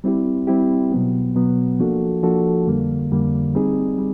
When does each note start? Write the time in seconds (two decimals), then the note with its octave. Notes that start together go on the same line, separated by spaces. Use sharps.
0.04 G3 C4 E4 G4
0.47 G3 C4 E4 G4
0.92 B2 F#3 B3
1.35 B2 F#3 B3
1.79 F3 A#3 D4 F#4 A4
2.23 F3 A#3 D4 F#4 A4
2.67 F2 D3 G3 A#3
3.11 F2 D3 G3 A#3
3.55 G3 C4 D#4 G#4
3.99 G3